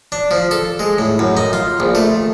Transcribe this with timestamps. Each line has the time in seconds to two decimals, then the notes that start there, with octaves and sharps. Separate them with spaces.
0.12 D4
0.31 F3
0.51 A4
0.79 G#3
0.98 A2
1.19 F#2
1.37 D#4
1.53 F4
1.80 A#1
1.95 A3